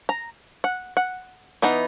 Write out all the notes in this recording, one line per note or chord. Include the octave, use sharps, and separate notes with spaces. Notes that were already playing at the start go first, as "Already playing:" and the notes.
A#5
F#5
F#5
E3 B3 D#4